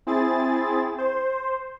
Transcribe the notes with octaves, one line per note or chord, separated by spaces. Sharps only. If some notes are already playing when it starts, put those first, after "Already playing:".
C4 E4 G#4 A6
C5